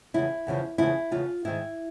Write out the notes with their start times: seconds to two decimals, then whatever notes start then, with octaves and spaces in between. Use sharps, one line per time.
0.14 E2 C#3 F3 E4
0.47 E2 C#3 F3
0.78 E2 C#3 F3 E4
1.11 E2 C#3 F3 F4
1.45 G#2 D#3 E4